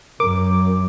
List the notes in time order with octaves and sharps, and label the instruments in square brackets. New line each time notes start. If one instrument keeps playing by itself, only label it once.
[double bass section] F#2 [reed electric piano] A#4 [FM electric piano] D6